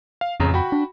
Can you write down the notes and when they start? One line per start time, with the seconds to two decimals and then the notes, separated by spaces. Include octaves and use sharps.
0.21 F5
0.40 A1 F2 C#3 A#5
0.54 F#4 G5 B5
0.72 D4